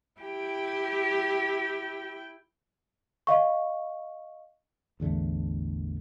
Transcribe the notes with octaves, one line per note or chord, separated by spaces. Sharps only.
E4 G4 G5
D#5 F5 C#6
A1 E2 D3 A3